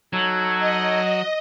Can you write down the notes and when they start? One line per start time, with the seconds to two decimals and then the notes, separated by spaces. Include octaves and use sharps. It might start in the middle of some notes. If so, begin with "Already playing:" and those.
0.13 F#3 D#4 A4 C#5
0.60 D#5